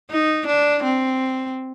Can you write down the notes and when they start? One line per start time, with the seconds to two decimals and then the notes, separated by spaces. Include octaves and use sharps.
0.11 D#4
0.47 D4
0.84 C4